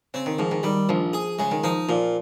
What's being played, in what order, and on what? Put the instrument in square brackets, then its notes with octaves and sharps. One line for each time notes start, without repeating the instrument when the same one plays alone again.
[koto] C#3 [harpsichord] C4
[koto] D#3
[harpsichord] G#2 [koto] F3
[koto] D#3
[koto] D#3 [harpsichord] G3
[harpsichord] A#1 [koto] F3
[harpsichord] G#4
[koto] C#3 [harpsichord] G#3
[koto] D#3
[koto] F3 [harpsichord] D#4
[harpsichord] A#2 [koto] F3